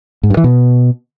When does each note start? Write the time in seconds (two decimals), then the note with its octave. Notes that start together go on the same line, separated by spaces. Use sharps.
0.23 G#2
0.30 G2
0.37 E3
0.44 B2